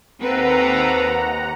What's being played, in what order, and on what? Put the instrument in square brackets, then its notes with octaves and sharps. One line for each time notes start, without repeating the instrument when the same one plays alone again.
[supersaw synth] D#2 F#5 A#5 [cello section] C4 A4 B4